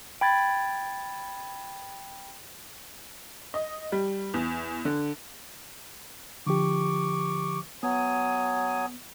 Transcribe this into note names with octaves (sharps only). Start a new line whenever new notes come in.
G5 B5 G#6 A6
D#5
G3
E2
D3
D3 F3 G4 C#6 D6
F#3 B3 G#5 D#6